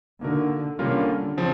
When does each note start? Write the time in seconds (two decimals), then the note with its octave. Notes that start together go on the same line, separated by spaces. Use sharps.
0.21 D3 A#3 D#4 F#4 A#4
0.79 D3 G3 A#3 C#4 F4 A#4
1.37 C#3 F3 C4